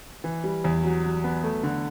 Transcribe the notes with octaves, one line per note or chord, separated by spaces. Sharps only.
E3
G3
E2
F#3
F#3
B3
A3
D3